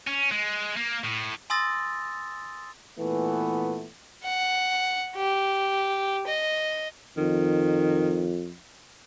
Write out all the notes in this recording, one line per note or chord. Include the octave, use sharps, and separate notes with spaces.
C#4
G#3
A#3
A2
G#5 C6 D#6 E6 A6 A#6
A#2 E3 A3 B3
F#5
G4
D#5
F2 D#3